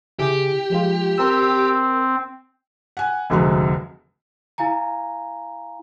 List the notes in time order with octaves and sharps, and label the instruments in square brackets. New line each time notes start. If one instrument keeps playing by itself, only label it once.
[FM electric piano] C#3 E4 G#4 [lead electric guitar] G4
[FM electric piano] F3 G#3 F4
[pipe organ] C4 [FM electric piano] A#4 E6
[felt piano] F#5 G#5
F1 D2 G#3 F#4 A#5
[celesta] E4 F5 G#5 A#5